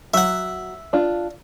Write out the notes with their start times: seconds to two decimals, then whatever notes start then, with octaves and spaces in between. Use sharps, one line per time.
0.14 F#3 E5 F#5
0.93 D4 F4